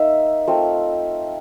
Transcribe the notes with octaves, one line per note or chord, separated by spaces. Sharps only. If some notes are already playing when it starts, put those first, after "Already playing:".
Already playing: A#3 D#4 E5
A3 C4 F4